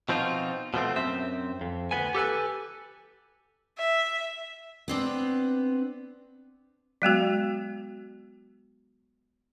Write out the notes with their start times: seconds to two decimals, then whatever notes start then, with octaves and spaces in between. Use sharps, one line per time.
0.09 B2 F3 C4 D#4 F4
0.74 B2 F3 A3 C4
0.96 F#2 C4 E5
1.61 F2
1.91 D2 D#3 B3 G#5
2.15 G4 A4 B4 G#5
3.78 E5
4.88 B3 C4 D4
7.02 F#3 G#3 B3 F#4